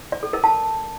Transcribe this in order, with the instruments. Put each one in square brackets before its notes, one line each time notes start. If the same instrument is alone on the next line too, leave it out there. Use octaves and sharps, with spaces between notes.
[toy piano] D5
A4
A#4
A5